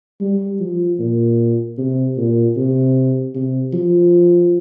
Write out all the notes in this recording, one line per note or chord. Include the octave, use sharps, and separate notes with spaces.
G3
F3
A#2
C3
A#2
C3
C3
F3